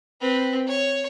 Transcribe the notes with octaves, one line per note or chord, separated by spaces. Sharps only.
C4 B4
C#5